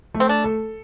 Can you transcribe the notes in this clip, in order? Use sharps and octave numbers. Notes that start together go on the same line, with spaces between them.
A3
C4
D4
A4